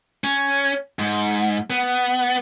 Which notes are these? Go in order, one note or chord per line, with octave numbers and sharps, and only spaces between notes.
C#4
G#2
B3